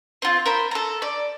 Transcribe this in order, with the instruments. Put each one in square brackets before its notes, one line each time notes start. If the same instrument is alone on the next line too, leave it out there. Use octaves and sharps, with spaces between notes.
[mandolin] C4 F4
A#4 C5 B5
A4 A#5
D5